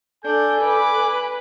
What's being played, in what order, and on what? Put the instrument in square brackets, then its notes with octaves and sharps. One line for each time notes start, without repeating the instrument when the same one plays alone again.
[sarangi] D4 [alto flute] A4 [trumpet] G#5 [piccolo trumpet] G6
[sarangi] B4 [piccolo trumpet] D6